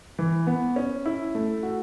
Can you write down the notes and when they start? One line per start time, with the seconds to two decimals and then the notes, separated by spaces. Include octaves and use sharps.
0.19 E3
0.47 B3
0.76 C#4
1.06 E4
1.35 A3
1.63 F#4